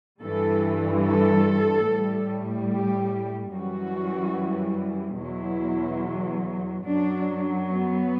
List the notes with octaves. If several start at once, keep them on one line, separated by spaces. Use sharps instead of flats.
G2 E3 G3 A4
A4
A2 G3
G4
F#2 E3 G3 F#4
E2 B2 F#3 E4
F#2 F#3 D4
B3